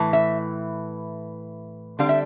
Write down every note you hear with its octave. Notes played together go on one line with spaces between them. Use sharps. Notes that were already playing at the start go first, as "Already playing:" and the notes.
Already playing: A2 E3
E5
D3 G3 C4 F5
E5